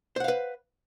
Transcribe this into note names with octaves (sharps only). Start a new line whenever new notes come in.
B4 C5 F5 F#5